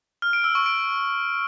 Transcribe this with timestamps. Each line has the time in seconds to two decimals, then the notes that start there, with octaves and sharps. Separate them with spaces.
0.22 F6
0.33 D7
0.44 E6
0.55 C#6
0.66 D7